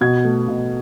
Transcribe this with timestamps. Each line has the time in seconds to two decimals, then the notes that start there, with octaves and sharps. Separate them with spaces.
0.01 B2 G#6
0.25 A3
0.48 B2